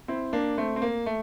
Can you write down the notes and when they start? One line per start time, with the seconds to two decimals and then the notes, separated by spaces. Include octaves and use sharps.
0.08 C4 E4
0.33 A#3 D4
0.58 A3 C4
0.76 C4
0.82 A#3
1.06 A3